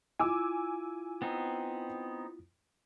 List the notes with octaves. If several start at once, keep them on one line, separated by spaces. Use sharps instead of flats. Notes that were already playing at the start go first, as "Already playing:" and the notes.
E4 F4 G#5 D6 E6
B3 C4 D#4